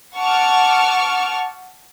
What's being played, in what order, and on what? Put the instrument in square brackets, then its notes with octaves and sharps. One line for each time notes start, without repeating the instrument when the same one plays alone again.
[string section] F#5 A5 C#6 D6 F6